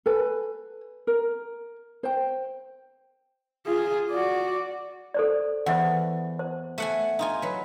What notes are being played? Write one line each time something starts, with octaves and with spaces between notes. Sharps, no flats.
A4 B4 G#5
A#4
C5 G5
F4 G#4
F#4 D5
A4 C5 D5
E2 C5 E5 F#5
C5
A3 F#5 G#5
D#4 F4 G#5
F#3 B4